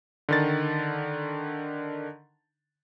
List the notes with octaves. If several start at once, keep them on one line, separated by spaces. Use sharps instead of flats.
D3 D#3 A6